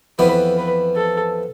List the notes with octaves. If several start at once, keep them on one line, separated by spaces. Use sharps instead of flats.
F2 E3 B3 B4
B4
A4